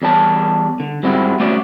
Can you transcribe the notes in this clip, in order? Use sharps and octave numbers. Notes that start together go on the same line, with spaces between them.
E2 G3 C#5 A5
D3
G#2 G3 C4 E4 F#4
A3 C#4 F#4 C5 D5